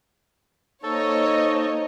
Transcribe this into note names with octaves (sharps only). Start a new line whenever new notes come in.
A#3 D#4 A4 C5 C#5 D#5 C#6